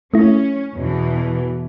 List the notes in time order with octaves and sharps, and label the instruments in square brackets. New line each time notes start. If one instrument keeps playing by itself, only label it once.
[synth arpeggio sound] A3 E4 [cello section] C#4
[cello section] E2 B2 E3